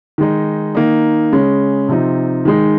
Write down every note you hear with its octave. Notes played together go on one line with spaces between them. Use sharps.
D#3 G#3 D#4
D#3 A#3 D#4
C#3 G#3 C#4
C3 F3 C4 D#4
D#3 G#3 D#4